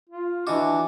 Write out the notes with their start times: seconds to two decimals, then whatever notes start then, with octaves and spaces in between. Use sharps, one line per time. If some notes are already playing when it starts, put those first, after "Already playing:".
0.09 F4
0.47 E3 D4 F#4 D#5 D6